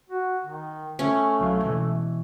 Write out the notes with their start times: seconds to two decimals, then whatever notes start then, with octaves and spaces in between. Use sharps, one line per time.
0.09 F#4
0.45 D#3
0.99 A3 C#4
1.39 C2 F#3 F5
1.65 B2 E3